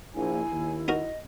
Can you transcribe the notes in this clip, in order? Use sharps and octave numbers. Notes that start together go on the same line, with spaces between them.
A#1 E4 G#5
D#2
D#4 F#4 A#4 D#5